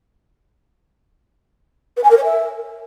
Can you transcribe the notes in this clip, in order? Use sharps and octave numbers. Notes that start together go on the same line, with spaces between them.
B4
G#5
A#4
C#5
E5